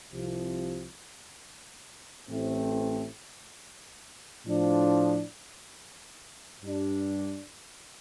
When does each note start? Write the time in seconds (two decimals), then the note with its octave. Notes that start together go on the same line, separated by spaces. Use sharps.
0.12 C2 C3 F3
2.28 A1 A2 A3 C4
4.45 A2 F3 D4
6.62 G2 G3 D4